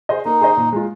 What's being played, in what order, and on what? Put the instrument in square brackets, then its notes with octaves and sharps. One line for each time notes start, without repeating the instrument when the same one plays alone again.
[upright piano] G#4 C5 D#5
[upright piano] A#3 [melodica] D#4
[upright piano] G#4 C5 D#5
A#2
G#3 F4